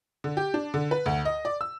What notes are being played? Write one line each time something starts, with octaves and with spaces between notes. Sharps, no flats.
D3
G4
D4
D3
B4
D2
D#5
D5
E6